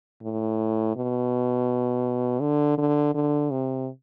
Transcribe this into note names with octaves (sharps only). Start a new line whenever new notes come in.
A2
B2
D3
D3
D3
C3